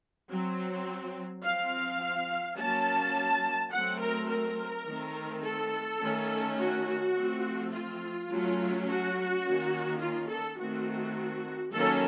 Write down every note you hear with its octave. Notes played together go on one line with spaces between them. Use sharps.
F#3 C4
F3 C4 F5
F#3 A#3 C#4 A5
F#3 A3 C4 F#5
A#4
A#4
D#3 A3 C4
A4
D#3 A3 C#4
F#4
F3 A3 C4
F4
F#3 A3 C#4
F#4
D#3 A#3 C#4
F4
A4
D#3 A3 C4 F#4
D#3 F#3 A#3 C#4 A4